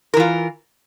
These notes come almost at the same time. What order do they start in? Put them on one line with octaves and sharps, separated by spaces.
A#4 E3 F4